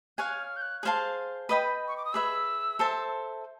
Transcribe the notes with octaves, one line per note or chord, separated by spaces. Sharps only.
C#5 F5 G#5 F#6
F6
G6
F#6
G#4 C5 F5 A5
B4 D#5 G5 B5
C#6
D6
D#6
G#4 B4 E5 E6
A4 C5 E5 A5